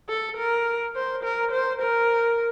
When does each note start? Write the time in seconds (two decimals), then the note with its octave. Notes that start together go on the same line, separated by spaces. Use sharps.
0.09 A4
0.37 A#4
0.95 C5
1.24 A#4
1.52 C5
1.81 A#4